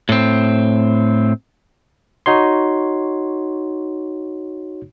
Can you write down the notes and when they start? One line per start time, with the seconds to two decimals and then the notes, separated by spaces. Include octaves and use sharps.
0.09 A2 C4
2.26 D#4 F#4 C#5 C6